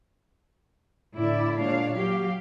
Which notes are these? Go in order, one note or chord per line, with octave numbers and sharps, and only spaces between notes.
A2 D3 E4 D5 E5
A#2 G#3 D4 C#5 F5
F#3 G4 F5